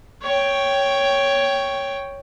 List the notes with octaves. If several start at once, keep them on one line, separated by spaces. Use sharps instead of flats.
C#5 G5